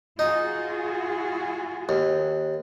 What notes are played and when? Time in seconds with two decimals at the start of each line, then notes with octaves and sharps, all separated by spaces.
0.19 D#4 F4 F#4 G#4
1.89 D#2